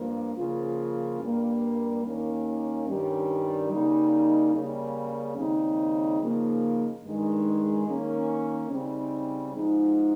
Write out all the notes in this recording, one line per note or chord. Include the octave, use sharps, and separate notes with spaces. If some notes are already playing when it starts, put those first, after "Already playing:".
Already playing: G2 F3 A#3
C#3 F3 A#3 F4
G2 G3 A#3
D#2 D#3 A#3 C#4
G2 D#3 G3 C#4
C#3 G3 A#3 D#4
C#3 G3 A#3 C#4
D#2 C#3 G3 C4 D#4
C#3 F3 A#3 D#4
G2 D#3 G#3 D#4
D#3 A#3 C#4
C#3 G3 C4 D#4
G#2 F3 G#3 D#4